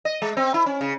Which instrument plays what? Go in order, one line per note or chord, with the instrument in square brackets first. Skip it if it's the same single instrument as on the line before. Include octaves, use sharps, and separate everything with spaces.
[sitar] D#5
G#3
C4
E4
C#4
C#3